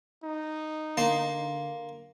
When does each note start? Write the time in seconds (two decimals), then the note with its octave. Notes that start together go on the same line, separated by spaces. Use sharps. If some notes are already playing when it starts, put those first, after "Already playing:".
0.24 D#4
0.97 D3 A#3 A5 C6